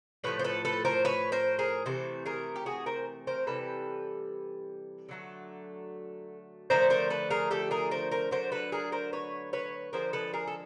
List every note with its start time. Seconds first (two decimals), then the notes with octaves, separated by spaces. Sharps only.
0.24 A2 F3 A3 B4 C#5
0.39 C5
0.44 A4 B4
0.65 A4 B4
0.85 A#4 C5
1.05 B4 C#5
1.32 A#4 C5
1.59 G#4 A#4
1.86 C3 E3 A3 C5
2.26 G#4 A#4
2.56 G4
2.66 F#4 G#4
2.86 A#4 C5
3.27 A#4 C5
3.47 C3 E3 G3 A4 B4
5.09 D3 F#3 A3
6.70 D3 F3 A3 A#4 C5
6.90 A#4 C5
7.10 A4 B4
7.30 G#4 A#4
7.51 G4 A4
7.71 G#4 A#4
7.91 A#4 C5
8.11 A#4 C5
8.31 D3 F#3 A3 A#4 C5
8.52 A4 B4
8.72 G#4 A#4
8.92 A#4 C5
9.13 B4 C#5
9.53 B4 C#5
9.93 D3 F3 G#3 A#4 C5
10.13 A4 B4
10.33 G#4 A#4
10.47 A4